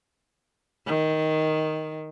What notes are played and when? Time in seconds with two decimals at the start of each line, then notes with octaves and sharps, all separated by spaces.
0.87 D#3